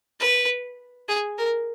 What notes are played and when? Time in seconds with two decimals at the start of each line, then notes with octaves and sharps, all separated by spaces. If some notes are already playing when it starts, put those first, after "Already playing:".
0.20 B4
1.09 G#4
1.38 A#4